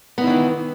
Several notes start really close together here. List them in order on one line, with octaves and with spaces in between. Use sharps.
B3 D#4 E4 D#3 E3